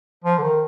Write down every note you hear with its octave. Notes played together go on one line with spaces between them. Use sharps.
F3
D3
D#3